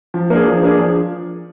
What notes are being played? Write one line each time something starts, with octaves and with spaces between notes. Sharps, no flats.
F3
A#3 D4 G#4
F3
A#3 D4 G#4
F3